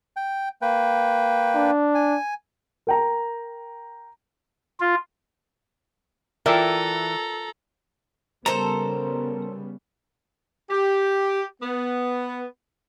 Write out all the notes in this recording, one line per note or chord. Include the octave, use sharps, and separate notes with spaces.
G5
A#3 B4 G5
D4
G#5
A#4 G5 A#5
F4
E3 F4 A4 A#4 D5 E5 G5 A#5
C#3 G3 B3 A4 A#4 C5 A#5
G4
B3